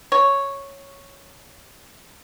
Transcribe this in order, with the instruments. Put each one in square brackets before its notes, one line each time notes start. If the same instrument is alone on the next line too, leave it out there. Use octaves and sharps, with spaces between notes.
[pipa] C#5